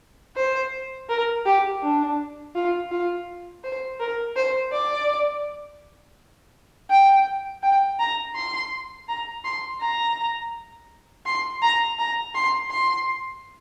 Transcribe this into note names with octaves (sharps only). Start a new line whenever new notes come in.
C5
A#4
G4
D4
F4
F4
C5
A#4
C5
D5
G5
G5
A#5
C6
A#5
C6
A#5
C6
A#5
A#5
C6
C6